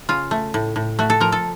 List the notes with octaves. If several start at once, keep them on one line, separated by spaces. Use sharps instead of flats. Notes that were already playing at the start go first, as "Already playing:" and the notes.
C#3 F4
A3
A2
A2
A3 F#4
A4
F3 A#4
A4